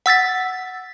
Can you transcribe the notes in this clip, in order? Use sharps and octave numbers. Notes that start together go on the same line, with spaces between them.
F#5 E6 A6 B6